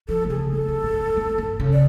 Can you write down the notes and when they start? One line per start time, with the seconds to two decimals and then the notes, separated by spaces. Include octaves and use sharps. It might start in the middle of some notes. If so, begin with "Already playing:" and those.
0.09 F3 A4
0.25 C3
0.30 C#3 G#4
0.51 D3 A4
0.68 D3
0.83 A2
1.00 G#2
1.17 F2
1.38 G2
1.60 C#3
1.73 D5